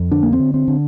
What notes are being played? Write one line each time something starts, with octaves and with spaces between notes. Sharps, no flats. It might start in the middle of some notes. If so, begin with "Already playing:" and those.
Already playing: F2
D3 D4
A#3
C4
D3
C4
D3